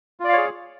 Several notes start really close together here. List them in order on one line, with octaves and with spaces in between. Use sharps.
F4 D5 F5 C#5 G#4